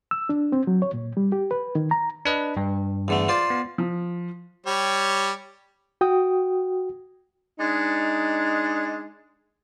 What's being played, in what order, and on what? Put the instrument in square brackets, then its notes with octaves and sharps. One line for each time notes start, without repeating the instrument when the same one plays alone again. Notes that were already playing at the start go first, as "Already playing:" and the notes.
[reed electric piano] E6
D4
C4
F#3
C#5
A#2
G3
G4
B4
D#3
A#5
[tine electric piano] D4 B4 D#5
G2
[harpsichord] E2 D3 A3
F4 C5 D5
[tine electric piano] B3
[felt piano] F3
[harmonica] G3 G4 C#5
[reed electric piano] F#4 G5 D#6
[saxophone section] G#3 D4 D#4